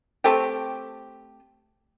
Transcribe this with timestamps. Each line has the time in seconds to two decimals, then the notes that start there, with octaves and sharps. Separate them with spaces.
0.24 A3 C4 G4